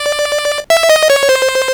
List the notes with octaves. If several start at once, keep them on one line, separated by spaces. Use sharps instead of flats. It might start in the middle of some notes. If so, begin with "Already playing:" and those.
Already playing: D5
E5
D#5
C#5
C5